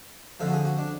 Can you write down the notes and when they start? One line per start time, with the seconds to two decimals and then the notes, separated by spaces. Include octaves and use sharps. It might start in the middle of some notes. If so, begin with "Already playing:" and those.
0.40 F2 D3 F3 A4
0.48 F#4
0.53 G#4
0.65 F#4
0.79 D4